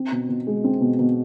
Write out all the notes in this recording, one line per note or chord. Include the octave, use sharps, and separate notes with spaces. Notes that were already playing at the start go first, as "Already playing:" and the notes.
Already playing: C4
B2
B2
G#3
C4
B2
B2